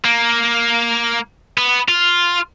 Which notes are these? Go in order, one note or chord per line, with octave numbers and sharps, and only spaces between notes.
A#3
B3
F4